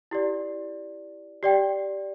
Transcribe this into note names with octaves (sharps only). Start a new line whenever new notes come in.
E4 G4 D5
G4 D5 G5